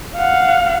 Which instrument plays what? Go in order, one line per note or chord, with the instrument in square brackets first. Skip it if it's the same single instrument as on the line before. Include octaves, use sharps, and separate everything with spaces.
[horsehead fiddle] F5 F#5